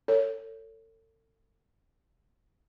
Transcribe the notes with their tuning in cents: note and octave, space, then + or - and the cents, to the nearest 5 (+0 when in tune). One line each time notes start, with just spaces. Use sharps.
A4 +35 C#5 +5